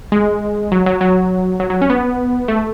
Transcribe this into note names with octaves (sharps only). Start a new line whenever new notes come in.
G#3
F#3
F#3
F#3
F#3
F#3
C#4
B3
A3